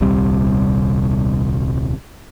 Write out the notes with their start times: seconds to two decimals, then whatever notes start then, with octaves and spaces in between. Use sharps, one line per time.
0.01 D#1 C2 C3 G3